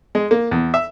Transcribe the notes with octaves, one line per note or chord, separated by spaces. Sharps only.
G#3
A#3
E2
E5